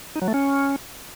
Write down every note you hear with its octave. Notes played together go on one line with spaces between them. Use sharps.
D#4
F#3
A3
C#4